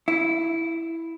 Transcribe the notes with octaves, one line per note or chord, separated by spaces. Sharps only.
E4